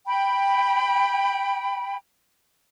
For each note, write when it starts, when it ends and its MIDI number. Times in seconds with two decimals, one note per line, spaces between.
0.06 1.96 79
0.06 1.96 83